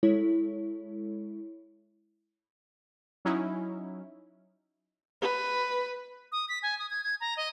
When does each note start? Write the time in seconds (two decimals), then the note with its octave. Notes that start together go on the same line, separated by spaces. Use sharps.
0.03 G#3 E4 A4 C#5
3.25 F#3 C#4 D#4 E4
5.22 B4
6.32 D#6
6.49 B6
6.63 G#5
6.79 D#6
6.90 G#6
7.04 G#6
7.21 A#5
7.37 D#5